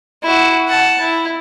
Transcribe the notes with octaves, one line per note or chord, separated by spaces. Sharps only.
E4 F#4
F#5 A5
E4